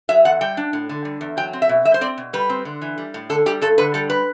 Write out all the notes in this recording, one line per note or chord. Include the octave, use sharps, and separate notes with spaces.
F#3 E5
E2 F#5
G3 G5
D4
A2
D3
G3
E2
F#3 G5
C4
E5
B2
G3 E5
C5
C4 D5
B2
G3 B4
C4
D3
E3
G3
A2
D3 A4
G3 G4
G2 A4
D3 B4
G3 A4
B4